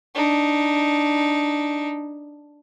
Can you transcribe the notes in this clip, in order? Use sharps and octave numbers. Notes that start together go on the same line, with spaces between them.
D4 D#4